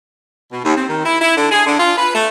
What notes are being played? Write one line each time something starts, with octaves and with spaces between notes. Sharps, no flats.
B2
D#2
C4
D#3
E4
E4
D3
G#4
D3
F4
B4
A3